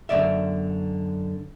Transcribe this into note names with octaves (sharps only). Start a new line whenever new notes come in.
F#2 D3 D#3 D5 E5